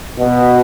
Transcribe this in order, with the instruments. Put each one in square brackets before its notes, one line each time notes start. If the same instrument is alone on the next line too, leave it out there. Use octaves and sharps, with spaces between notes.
[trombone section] B2